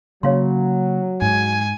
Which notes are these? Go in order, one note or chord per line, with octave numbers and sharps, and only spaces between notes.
C#3 F#3 A#3 C#5 F5 C6
G#2 G#5